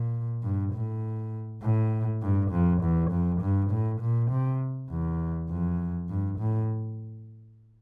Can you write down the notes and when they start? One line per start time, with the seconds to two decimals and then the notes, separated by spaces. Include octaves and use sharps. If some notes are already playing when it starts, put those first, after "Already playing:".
Already playing: A#2
0.43 G2
0.73 A2
1.63 A2
2.22 G2
2.52 F2
2.82 E2
3.11 F2
3.42 G2
3.71 A2
4.01 A#2
4.31 C3
4.90 E2
5.49 F2
6.09 G2
6.39 A2